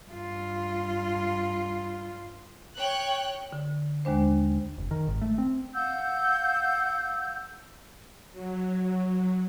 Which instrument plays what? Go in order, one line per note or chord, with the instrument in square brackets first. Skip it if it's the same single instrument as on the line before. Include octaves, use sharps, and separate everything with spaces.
[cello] G2 F4
[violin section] C#5 G5 F#6
[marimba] D3
D#2 G#3 D4 C5
[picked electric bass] F1
D#3
G#1
A3
C4
[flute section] F5 F#5 E6 G6
[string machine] F#3